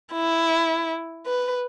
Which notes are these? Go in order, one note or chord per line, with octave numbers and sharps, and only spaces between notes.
E4
B4